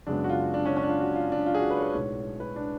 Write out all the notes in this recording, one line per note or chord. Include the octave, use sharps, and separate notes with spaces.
F#2 C#3 G#3 B3 D4
F#4
F4
D4
C#4
C#4
D4
F4
F#4
F4
D4
F4
G#4
F#4
B4
C#5
B4
B1 A2 G#3 C#5
B4
D4